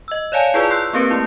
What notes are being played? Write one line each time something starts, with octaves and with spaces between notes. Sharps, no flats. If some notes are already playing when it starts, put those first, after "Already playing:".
D#5 E6
C#5 D5 F5 G#5 A5
E4 F4 G#4 B4 D5
C6 E6 F#6 G6 C7
A#3 C4 G4 A#4 B4
A3 E4